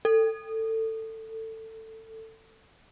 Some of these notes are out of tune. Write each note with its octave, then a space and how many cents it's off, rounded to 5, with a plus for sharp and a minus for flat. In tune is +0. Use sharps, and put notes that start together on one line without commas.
A4 +20